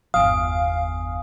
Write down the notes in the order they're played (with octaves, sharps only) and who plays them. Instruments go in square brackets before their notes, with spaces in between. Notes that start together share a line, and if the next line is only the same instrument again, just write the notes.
[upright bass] G1 E2 [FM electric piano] F5 [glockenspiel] G#5 D#6